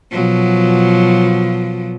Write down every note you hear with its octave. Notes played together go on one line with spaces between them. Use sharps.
B2 F3 F#3